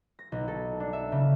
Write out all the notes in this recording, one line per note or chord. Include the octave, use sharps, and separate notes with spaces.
A#6
B1
A4
D4
E5
C#3